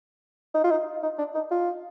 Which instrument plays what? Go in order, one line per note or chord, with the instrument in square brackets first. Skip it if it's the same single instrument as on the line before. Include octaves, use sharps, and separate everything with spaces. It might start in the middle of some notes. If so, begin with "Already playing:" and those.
[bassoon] D#4
F4
D#4
D#4
D4
D#4
F4